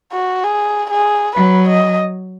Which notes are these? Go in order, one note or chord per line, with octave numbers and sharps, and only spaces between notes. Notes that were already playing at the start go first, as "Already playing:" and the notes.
F#4
G#4
G#4
F#3 B4
D#5